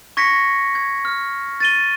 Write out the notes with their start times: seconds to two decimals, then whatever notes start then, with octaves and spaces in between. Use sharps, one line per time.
0.17 C#6 G#6 A#6 B6 C#7
0.75 G#6
1.05 F6
1.60 A6 D#7 G7